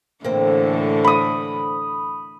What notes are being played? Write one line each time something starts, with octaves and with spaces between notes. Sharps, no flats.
A2 D3 E3 A#3 C4
B5 D#6